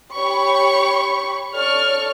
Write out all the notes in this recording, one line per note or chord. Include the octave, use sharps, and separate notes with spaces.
G4 C#5 B5 C#6
A4 C#5 D5 C#6 F6